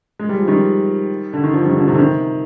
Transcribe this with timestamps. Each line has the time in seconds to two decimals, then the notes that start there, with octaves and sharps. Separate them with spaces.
0.19 G#3
0.29 G3
0.38 F3
0.47 D#3 G3
1.33 D3
1.44 D#3
1.54 D3 F3
1.65 D#3 G3
1.76 D3 F3
1.88 C3 D#3
1.94 D3
1.99 C3 D#3